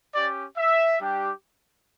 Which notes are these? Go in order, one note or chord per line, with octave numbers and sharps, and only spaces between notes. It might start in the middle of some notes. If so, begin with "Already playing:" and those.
C#4 G4 D5
E5
G3 D4 G4